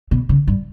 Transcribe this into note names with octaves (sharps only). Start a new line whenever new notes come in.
B2
C#3
G2